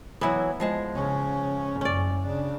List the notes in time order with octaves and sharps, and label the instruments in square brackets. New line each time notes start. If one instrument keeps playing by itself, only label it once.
[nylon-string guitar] E3 F#3 [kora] B3 E4
[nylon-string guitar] F3 G#3 A5
[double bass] C#3 C#4
[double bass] F#1 F#2 [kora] C#4 D5
[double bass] C#3 D4